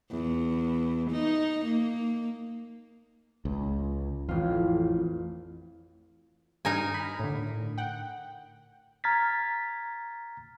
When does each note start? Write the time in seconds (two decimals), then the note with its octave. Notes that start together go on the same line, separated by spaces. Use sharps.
0.11 E2
1.10 D#4
1.65 A#3
3.45 C#2
4.29 A1 F2 F4
6.65 G2 D#4 A#4 G#5
6.94 B5
7.20 A2 D3
7.78 F#5 G5
9.04 A#5 F6 G#6 A6 B6